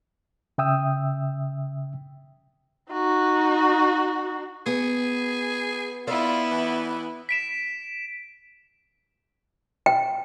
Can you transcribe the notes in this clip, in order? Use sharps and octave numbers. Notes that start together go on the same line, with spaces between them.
C#3 E5 G5 D#6 E6
D#4 F#4
B3 G#4
B3 E4 F4 D5 E5
E3
B6 D7 E7
G5